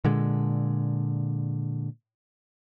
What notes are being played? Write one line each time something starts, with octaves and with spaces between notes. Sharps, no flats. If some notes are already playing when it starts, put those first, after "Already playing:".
A#2 D3 G#3